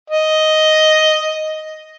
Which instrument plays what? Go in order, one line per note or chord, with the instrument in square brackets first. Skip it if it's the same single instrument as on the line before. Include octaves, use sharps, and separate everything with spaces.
[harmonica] D#5